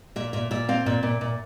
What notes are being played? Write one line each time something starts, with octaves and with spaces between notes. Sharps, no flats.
A#2 E5
A#2 E5
A#2 E5
C4 F5
A#2 E5
A#2
A#2